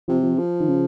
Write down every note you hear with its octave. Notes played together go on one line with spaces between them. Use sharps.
C3 F3
F3
F3
D#3
C#3